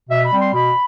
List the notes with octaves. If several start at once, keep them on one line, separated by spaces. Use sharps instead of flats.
B2 E5
B5
G3 C4
C6
B2 B5